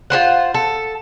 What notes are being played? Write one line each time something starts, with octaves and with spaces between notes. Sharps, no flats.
F4 G4 C5 F#5
A4